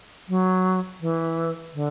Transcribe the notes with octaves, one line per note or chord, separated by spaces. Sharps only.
F#3
E3
D3